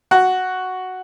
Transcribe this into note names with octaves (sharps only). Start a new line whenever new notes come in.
F#4